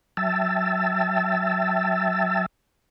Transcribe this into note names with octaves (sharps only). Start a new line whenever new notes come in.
F#3 E5 G5 A5 E6 A6